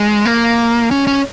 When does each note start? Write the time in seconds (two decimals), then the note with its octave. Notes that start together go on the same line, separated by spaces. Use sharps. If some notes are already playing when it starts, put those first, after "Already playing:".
Already playing: G#3
0.25 A#3
0.91 C#4
1.07 C#4